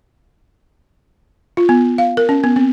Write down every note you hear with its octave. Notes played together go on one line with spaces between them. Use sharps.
F4
B3
F5
A#4
C#4
B3
C4